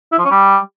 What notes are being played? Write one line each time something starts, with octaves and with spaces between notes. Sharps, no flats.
E4
F3
C#4
G3